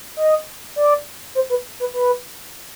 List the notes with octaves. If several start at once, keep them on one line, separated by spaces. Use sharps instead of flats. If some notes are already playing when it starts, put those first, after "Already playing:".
D#5
D5
C5
B4
B4
B4